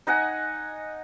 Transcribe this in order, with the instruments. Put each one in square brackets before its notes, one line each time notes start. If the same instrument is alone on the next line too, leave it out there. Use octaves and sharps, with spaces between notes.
[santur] D#4 D#5 F#5 G#5